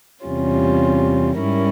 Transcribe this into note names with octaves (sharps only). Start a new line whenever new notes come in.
E2 C3 G3 C#4 F4
G#2 G3 C#4 E4 A#4